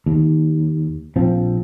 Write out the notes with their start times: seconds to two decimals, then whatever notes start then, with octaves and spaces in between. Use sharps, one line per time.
0.06 D#2
1.16 A#1 F3 C4